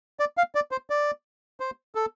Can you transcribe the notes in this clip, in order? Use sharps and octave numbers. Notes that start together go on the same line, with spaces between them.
D5
F5
D5
C5
D5
C5
A4